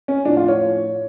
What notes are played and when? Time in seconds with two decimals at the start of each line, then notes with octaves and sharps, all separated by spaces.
0.08 C#4
0.25 A2 F3 D4
0.37 F4
0.48 C#5